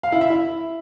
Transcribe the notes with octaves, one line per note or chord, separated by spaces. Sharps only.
F5
E4
E5
E4